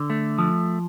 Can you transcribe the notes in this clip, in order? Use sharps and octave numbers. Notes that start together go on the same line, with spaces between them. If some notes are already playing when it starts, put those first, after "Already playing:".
Already playing: D3
A3
F3